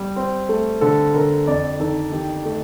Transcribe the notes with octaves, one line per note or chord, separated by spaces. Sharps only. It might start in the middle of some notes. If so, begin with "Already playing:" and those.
Already playing: G3
C4
A3
D3 A4
D3 A#4
F2 D5
D#3 A4
D#3 G4
A3